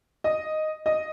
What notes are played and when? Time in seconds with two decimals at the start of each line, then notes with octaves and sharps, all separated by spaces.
0.24 D#5
0.86 D#5